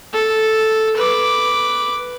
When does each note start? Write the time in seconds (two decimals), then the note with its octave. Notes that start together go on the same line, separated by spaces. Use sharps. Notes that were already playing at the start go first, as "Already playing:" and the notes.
0.13 A4
0.96 B4 D6